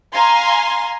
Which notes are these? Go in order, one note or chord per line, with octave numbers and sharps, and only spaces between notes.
F5 G#5 A#5 C6